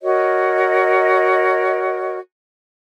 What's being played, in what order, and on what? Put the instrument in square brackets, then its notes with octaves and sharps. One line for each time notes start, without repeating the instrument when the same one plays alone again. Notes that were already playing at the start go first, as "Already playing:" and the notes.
[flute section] F#4 A#4 C#5 D#5